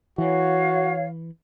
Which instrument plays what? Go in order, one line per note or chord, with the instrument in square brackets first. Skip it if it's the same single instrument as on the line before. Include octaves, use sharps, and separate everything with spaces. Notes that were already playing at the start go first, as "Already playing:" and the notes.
[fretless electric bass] E3 [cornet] F#4 [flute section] C#5 F5